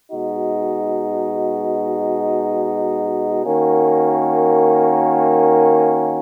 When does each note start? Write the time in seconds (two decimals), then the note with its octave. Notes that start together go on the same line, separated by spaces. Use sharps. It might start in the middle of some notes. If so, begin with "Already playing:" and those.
0.11 B2 G#3 D#4 F#4
3.44 D#3 A#3 C#4 F#4